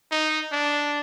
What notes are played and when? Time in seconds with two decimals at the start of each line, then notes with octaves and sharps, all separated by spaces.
0.11 D#4
0.52 D4